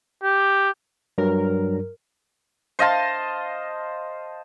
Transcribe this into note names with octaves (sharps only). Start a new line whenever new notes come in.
G4
G2 F#3 A#4
C5 D#5 F5 A5